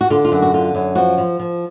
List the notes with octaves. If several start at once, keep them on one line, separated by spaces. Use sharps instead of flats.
F#4
D3 F4
F4
F#2
F#4
D3 F4
F#2
F3 F#4
F3
F3